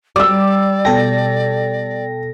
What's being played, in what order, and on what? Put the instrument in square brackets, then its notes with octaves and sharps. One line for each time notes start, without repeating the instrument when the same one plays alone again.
[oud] G3 [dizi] D5 [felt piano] D6 E6
[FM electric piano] B2 A4 A#6 [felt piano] G5